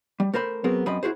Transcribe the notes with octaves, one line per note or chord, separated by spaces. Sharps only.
G3
A3 A#4 C5 B5
F#3 B3 C4 G#4 A#4
F#2 C4 D#5 B5
E4 F#4 G#4 C5